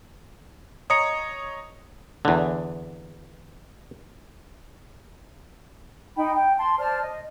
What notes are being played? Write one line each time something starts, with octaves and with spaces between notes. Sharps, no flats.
C#5 D#5 A#5 D#6 C#7
E2 D3
D#4 G5 B5
G5
A5 C6
C5 D5 A5 F6
D#5